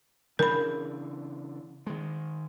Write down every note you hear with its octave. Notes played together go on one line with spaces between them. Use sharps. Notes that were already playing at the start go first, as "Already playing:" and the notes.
C#3 E3 D4 A#4 B5
D#3 G#3